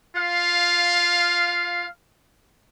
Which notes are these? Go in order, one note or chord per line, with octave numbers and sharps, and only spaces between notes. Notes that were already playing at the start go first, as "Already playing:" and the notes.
F4 F5